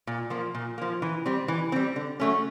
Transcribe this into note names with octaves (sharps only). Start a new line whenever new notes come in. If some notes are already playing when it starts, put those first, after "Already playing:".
A#2
F3 A#3
A#2
F3 A#3
E3
G3 C4
E3
G3 C4
D3
F#3 A3 C#4